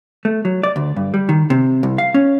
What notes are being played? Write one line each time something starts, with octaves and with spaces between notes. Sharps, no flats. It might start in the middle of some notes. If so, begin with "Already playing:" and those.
A3
F#3
D5
D2
G2
G3
D#3
C3
C2
F5
C#4